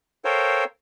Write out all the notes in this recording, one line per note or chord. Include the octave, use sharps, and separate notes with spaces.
A4 A#4 C5 C#5 F5 G5